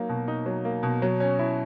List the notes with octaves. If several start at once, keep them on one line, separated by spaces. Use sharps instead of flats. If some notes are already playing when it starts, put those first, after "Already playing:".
Already playing: F#3 A#3 D#4
B2
D#4
F#3
A#3
B2
F#3
C#4
E4